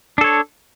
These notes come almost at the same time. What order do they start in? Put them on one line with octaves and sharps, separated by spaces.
D4 A4 C#5